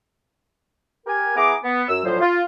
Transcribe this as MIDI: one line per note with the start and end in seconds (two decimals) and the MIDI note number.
1.06 1.33 67
1.06 1.33 70
1.06 1.33 80
1.36 1.54 59
1.36 1.54 64
1.36 1.54 68
1.36 1.54 82
1.36 1.54 86
1.63 1.83 59
1.88 2.02 42
1.88 2.02 88
2.04 2.19 38
2.04 2.19 45
2.04 2.19 53
2.04 2.19 54
2.04 2.19 72
2.21 2.42 65